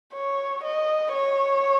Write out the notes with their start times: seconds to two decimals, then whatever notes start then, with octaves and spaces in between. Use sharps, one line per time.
0.13 C#5
0.63 D#5
1.14 C#5